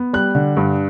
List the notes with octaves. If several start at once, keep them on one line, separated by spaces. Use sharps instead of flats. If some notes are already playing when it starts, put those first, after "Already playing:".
Already playing: B3
G3 F#6
D3
G2